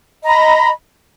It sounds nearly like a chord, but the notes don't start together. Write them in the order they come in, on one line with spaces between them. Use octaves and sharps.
D#5 A#5 B5